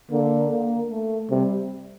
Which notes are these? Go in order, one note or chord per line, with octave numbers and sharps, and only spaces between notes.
D3 A#3
A#3
A3
C3 G3